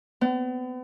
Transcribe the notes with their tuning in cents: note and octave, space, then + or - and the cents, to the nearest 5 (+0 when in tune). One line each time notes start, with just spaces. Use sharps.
B3 +40